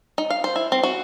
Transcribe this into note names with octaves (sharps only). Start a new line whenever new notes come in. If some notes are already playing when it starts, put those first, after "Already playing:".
D#4
F5
C5
E4
C4
F#4